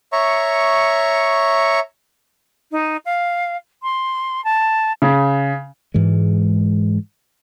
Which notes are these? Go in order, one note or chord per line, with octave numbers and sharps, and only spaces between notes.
C#5 E5 A#5 C#6
D#4
F5
C6
A5
C#3
G#2 E3 G#3